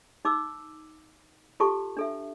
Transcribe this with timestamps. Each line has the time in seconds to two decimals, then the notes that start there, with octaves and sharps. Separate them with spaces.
0.25 D#4 D6 E6
1.60 F4 G4 A4 A5 C#6
1.97 D4 A4 E5